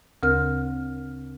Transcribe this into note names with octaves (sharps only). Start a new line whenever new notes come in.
D2 C#3 C4 A#4 F6